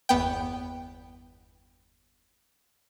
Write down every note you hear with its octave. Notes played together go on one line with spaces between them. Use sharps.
G1 E2 B3 G5